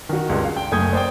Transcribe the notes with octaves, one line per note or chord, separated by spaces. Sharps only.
D#3 F#4
C#2 G2 D3
F5
G5
F#1 A3 G#5 D#6 G6 G#6
C5 D5 G5